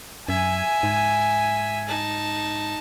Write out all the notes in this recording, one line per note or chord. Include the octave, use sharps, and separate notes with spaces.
F#2 E5 G#5
G#2
D#4 A5